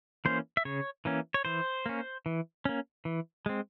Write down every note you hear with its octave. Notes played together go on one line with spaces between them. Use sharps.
E3 A#3 C#4 C5
E5
C#3 C#5
E3 A#3 C#4
C#5
E3 C5
A#3 C#4
E3
A#3 C#4
E3
G#3 C4